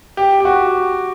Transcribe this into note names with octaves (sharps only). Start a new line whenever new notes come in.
G4
G4
F#4